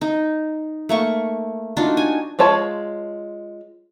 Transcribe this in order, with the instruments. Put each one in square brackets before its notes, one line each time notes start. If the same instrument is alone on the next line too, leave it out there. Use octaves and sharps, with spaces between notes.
[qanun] D#4
A3 A#3 C#6
D4 D#4 F4 F#4
G#5
[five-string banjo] G#3 F4 C#5 A5